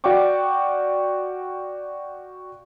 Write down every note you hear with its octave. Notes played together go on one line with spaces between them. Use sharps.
F#4 D5 F5 G5 C#6 D6